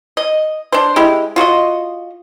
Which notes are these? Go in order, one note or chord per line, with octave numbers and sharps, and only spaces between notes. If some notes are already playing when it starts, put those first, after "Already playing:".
D#5
D4 C5
G#3 E4 G4
F4 F#4 C#5 D#5